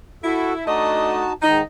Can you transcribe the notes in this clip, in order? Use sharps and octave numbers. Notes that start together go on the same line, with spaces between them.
E4 F#4 A4
A3 D4 D#4 F#4 D#5 A5
G#2 D#3 D#4